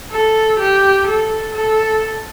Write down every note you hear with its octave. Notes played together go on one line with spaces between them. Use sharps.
A4
G4
A4
A4